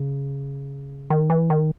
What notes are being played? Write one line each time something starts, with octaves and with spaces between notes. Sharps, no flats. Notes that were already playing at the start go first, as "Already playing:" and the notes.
Already playing: C#3
D#3
E3
D#3